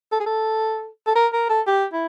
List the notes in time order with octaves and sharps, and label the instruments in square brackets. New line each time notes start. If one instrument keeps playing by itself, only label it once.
[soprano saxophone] A4
G#4
A4
A4
A#4
A#4
A4
G4
E4